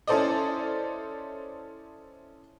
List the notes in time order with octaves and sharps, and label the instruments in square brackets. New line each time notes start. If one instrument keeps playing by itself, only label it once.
[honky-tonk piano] C#4 E4 A4 C5 D5 D#5